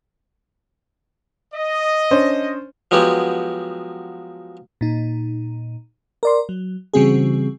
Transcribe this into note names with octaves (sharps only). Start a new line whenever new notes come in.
D#5
C#4 D4 C5
F3 F#3 G#3 B3 G4
A#2 D#4
A#4 D5 C6
F#3
C#3 E3 G3 C4 F#4 G#4